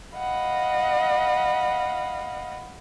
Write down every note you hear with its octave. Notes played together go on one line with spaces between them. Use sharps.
D#5 F5 F#5 B5